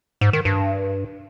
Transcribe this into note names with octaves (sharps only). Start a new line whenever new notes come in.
G#2
D#3
G2